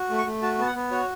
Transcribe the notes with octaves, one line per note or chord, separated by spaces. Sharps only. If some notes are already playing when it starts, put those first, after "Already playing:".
Already playing: F#4
A3
C#6
A3
F#4 A5
B3 A5
F#5
B3
F#4 C#5